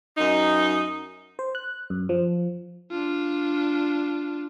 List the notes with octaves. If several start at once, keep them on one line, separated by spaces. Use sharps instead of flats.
F#2 D#4
C5
F#6
F#2
F3
D4 F4